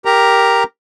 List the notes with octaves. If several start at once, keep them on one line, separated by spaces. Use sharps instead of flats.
G4 A#4 A#5